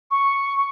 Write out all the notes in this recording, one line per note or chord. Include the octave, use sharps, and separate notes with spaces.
C#6